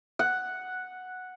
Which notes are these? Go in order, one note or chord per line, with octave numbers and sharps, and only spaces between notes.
F#5